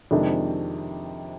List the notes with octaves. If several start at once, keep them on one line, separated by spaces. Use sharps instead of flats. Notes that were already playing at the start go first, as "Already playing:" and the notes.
F2 C3 D#3 G#3 D4